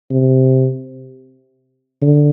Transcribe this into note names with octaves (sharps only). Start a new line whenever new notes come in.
C3
D3